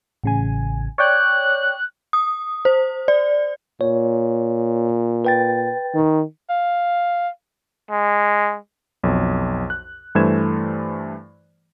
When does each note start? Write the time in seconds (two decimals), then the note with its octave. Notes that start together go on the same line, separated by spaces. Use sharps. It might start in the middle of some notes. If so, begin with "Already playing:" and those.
0.24 A1 C#3 G#5
0.98 C#5 D5 G5 F#6
2.13 D#6
2.65 C5
3.08 D5
3.81 A#2 C#5
5.25 B4 G5 A6
5.94 D#3
6.50 F5
7.91 G#3
9.03 B1 F2
9.70 F#6
10.15 G2 E3 A3 C5 G#6 E7